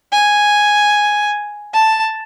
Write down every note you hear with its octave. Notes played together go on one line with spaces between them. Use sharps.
G#5
A5